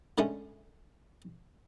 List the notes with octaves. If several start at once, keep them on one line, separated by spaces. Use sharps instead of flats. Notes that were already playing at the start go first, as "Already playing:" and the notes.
D3 G#3 A3 C#4